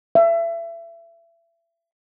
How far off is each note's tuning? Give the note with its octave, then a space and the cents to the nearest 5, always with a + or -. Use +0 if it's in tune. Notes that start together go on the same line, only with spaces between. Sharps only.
E5 +30